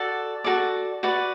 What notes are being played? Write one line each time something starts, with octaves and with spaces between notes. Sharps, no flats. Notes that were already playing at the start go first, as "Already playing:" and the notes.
Already playing: F#4 A4 D5
F#4 A4 D5
F#4 B4 D5